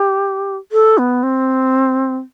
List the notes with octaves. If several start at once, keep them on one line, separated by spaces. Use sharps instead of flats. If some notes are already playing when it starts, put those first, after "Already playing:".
Already playing: G4
A4
B3
C4